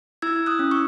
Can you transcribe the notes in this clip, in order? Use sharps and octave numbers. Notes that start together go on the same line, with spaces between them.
E4 E6 G#6
D#6 F#6
C#4
C#6 E6